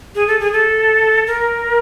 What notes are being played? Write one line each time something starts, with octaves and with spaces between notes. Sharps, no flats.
G#4
A4
G#4
A4
A#4